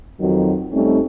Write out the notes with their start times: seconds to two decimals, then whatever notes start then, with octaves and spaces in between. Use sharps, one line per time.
0.20 F2 D#3 F3 F#3
0.72 F2 G3 A3 C4 C#4 D#4